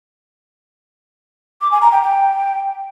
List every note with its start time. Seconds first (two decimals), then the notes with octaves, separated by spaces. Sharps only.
1.61 D6
1.72 G#5
1.82 A#5
1.92 G5
2.02 G5